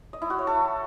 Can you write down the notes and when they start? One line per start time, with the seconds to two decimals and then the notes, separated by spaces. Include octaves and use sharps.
0.13 D#5
0.22 E4
0.30 F#4
0.39 C#5
0.47 A4